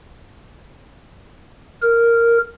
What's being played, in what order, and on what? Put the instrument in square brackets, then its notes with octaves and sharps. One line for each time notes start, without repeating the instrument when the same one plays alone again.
[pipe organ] A#4